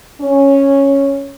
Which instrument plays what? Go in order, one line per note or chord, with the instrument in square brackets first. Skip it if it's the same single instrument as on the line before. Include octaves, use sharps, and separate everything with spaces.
[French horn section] C#4